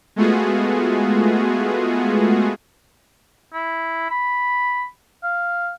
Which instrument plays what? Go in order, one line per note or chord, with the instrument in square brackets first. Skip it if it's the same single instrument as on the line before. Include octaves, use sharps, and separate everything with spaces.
[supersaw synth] G#3 A3 B3 F4 F#4 G#4
[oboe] E4
B5
F5